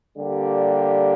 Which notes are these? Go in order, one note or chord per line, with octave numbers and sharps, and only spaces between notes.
D3 G3 A#3 D4 G4